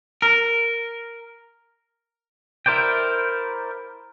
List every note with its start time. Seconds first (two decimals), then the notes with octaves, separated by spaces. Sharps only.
0.22 A#4
2.66 E4 A#4 C5 D5 G5